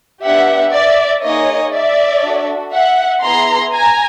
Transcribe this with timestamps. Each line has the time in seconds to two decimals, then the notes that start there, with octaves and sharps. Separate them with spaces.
0.24 B3 D4 G4 E5 F#5
0.73 D5 E5
1.23 A#3 D#4 G#4 C#5 D#5
1.73 D5 E5
2.23 D4 F#4 A4
2.73 E5 F#5
3.22 B3 E4 G#4 A#5 C6
3.73 G#5 A#5